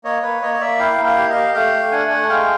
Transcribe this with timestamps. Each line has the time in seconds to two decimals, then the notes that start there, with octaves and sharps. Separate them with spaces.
0.04 A#3 C#5 D#5
0.23 A#3 B4 C#5
0.42 A#3 C#5 D#5
0.54 D#5
0.60 A#3 D5 E5
0.79 E4 F5 G5
0.98 A#3
1.04 F5 G5
1.16 G4
1.29 D#5 F5
1.36 G4
1.54 A3 F5 G5
1.73 A3
1.92 D4 F#5 G#5
2.11 A3
2.29 G#3 F5 G5